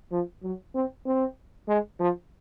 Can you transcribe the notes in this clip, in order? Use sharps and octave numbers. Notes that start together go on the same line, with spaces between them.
F3
F#3
C4
C4
G#3
F3